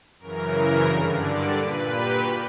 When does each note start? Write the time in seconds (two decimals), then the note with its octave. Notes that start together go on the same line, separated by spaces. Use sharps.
0.19 F#2 C#3 E3 A#4
0.86 G2 D3
1.19 D5
1.52 A#2 B4
1.85 G4
2.18 F#4